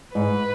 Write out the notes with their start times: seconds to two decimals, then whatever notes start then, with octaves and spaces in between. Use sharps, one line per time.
0.15 G#2 B4